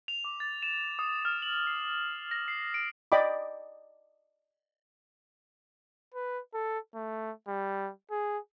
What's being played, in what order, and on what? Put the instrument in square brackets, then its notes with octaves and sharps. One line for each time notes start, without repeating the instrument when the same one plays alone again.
[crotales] F7
D6
A6
E7
D#6
F6
F#7
C7
A#6
C7
D7
[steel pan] D5 D#5 G5 B5 D6
[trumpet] B4
A4
A3
G3
G#4